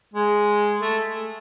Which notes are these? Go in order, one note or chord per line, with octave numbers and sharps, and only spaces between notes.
G#3
A3